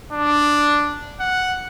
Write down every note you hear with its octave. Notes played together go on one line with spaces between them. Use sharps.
D4
F#5